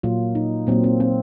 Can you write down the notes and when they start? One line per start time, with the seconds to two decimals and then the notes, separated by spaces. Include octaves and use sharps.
0.03 A#2 F#3 A#3 F4
0.35 D#4
0.67 A#2 F#3 A#3 C4
0.84 C4
1.00 C4